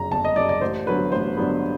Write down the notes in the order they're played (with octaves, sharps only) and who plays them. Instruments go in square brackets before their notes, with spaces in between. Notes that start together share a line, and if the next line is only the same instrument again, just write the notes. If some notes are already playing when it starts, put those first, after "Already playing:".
Already playing: [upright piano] G1 F#2 C#3 A#5
G1 A5
D#5
F#2 C#3 D5
D5
A1 C5
G2 D3 F#3 B3 B4
A1 C5
G2 D3 F#3 B3